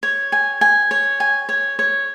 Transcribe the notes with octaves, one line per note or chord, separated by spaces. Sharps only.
C#5
G#5
G#5
C#5
G#5
C#5
C#5